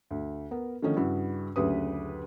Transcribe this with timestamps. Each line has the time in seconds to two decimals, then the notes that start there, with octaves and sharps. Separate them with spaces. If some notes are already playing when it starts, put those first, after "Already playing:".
0.11 D2
0.51 B3 A#4
0.82 D3 D#3 F3 A3 C#4 D#4
0.96 G2 C#3 E4 F#4
1.56 F#1 D2 C#3 G4 B4 D#6